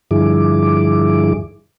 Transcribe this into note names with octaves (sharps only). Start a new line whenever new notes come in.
G2 D3 F3 E4 G#4 D6